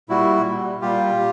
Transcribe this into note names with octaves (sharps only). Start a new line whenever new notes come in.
A#2 G3 E4 F#4
A#2 G3
A#2 G3 F4 G4